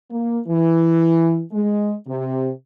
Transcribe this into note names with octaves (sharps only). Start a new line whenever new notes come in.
A#3
E3
G#3
C3